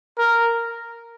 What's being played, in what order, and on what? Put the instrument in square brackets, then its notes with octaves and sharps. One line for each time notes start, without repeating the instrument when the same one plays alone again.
[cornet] A#4